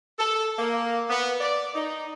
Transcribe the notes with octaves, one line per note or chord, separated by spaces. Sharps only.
A4
A#3
B3
D5
D#4